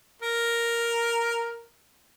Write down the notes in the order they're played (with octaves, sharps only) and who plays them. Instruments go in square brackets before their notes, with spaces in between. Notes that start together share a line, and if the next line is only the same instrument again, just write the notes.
[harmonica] A#4